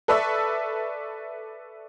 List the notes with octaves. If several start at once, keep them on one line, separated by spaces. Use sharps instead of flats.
A4 B4 D5 E5 C#6 E6